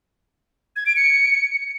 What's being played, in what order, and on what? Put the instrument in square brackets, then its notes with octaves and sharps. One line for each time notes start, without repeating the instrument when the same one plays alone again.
[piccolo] G#6
D7
C#7